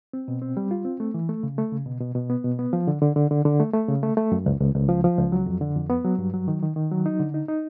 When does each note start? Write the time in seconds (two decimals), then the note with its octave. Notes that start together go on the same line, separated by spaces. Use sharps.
0.13 C4
0.28 B2
0.42 C4
0.57 G3
0.71 F4
0.85 C4
1.00 A3
1.14 E3
1.29 A3
1.43 C#3
1.58 A3
1.72 C#3
1.86 B2
2.01 B2
2.15 B2
2.30 B3
2.44 B2
2.59 B3
2.73 F3
2.88 D3
3.02 D3
3.16 D3
3.31 D3
3.45 D3
3.60 A3
3.74 A3
3.88 C#3
4.03 A3
4.17 A3
4.32 F#2
4.46 C#2
4.61 C#2
4.75 C#2
4.89 F3
5.04 F3
5.18 C#2
5.32 F#3
5.46 F2
5.61 D3
5.76 F2
5.90 B3
6.05 F#3
6.18 G2
6.34 F#3
6.48 D#3
6.62 D#3
6.76 D#3
6.91 F#3
7.06 D#4
7.20 D3
7.34 D#4
7.48 D#4